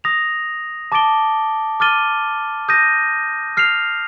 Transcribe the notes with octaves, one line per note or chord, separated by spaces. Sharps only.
D#6 A#6 F7
A5 D6 A6 D7 G7
D6 F6 A6 D#7 G7
D#6 G6 A#6 D#7
F6 C7 F7